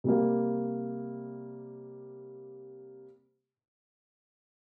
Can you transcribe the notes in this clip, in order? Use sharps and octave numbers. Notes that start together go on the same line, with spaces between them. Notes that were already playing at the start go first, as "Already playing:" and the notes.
C3 G3 A#3